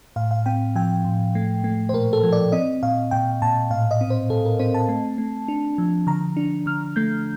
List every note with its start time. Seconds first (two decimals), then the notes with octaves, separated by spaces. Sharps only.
0.16 A2 F5
0.31 F5
0.46 C4 G5
0.75 F3 G5
1.04 A2
1.35 A3
1.64 A3
1.89 C5
1.93 A#2 A#4
2.13 A4
2.23 F3
2.33 D5
2.52 C4 D#5
2.83 A#2 F5
3.11 A#2 G5
3.42 A#2 A5
3.70 A2 F5
3.91 D#5
4.01 C4
4.10 C5
4.30 A2 A4
4.45 A#4
4.59 C4 C5
4.74 A5
4.89 A3
5.18 A3
5.48 D4
5.78 F3
6.07 D3 A#5
6.37 D4
6.66 D3 F6
6.96 A3 G6